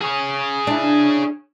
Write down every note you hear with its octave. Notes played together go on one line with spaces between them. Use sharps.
G#4 C#5
D4 E4